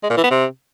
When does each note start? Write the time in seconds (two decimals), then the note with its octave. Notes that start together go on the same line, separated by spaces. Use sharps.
0.03 G#3
0.10 A#2
0.17 E3
0.24 B3
0.31 C3